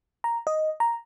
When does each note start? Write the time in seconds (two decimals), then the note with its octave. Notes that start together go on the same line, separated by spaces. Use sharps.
0.24 A#5
0.47 D#5
0.80 A#5